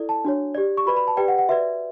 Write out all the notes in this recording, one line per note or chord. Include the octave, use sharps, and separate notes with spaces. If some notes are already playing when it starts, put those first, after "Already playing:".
Already playing: E4 A4 D5
A5
D4 F#4 C#5
G4 D5
C#6
F#4 B4 D5 B5
B5
A5
G4 B4 D5 G5
F#5
F#5
F#4 B4 D5 E5